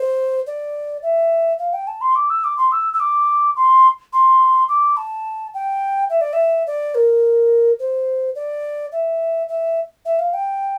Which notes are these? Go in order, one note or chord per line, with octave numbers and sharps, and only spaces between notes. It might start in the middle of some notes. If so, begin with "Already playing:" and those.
Already playing: C5
D5
E5
F5
G5
A5
C6
D6
E6
D6
C6
E6
E6
D6
C6
C6
D6
A5
G5
E5
D5
E5
D5
A#4
C5
D5
E5
E5
E5
F5
G5